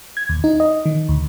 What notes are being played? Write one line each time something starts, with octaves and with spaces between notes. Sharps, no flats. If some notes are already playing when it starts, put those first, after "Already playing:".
G#6
D#2
D#4
D#5
D#3
D2